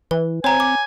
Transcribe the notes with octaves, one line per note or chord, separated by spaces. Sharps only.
E3 B4
C4 C#5 G#5 A#5
D6